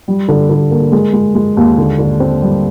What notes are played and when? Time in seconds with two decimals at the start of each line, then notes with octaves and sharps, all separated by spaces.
0.08 G3
0.28 D3
0.50 D3
0.71 A#3
0.92 G#3
1.13 G#3
1.35 G#3
1.57 D#2
1.78 D3
1.99 D3
2.20 C4
2.42 G3